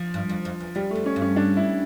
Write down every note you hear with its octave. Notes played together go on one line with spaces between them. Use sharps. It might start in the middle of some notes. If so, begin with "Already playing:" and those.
Already playing: F3
G2
F2
F2
E2
F2 G3
A3
F2
C#4
G2
C#4
D4
E4